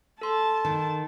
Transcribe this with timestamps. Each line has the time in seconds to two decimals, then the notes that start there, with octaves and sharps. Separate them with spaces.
0.21 A4 A5 C6
0.65 D#3